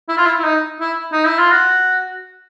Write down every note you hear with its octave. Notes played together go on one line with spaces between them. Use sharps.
E4
F4
E4
E4
D#4
E4
D#4
E4
F4
F#4